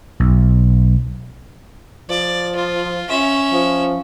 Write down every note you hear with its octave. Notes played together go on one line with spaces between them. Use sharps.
B1
F3 D5
F4
C#4 E5
F3